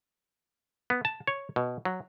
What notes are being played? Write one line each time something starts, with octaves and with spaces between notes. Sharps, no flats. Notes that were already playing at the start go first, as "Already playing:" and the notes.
B3
A5
C#5
B2
F#3